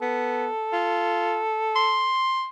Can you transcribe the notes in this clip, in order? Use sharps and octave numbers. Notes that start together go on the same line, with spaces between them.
B3 A4
F4
C6